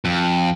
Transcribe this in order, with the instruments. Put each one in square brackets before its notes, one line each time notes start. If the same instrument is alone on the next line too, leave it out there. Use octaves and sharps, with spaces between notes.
[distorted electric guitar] F2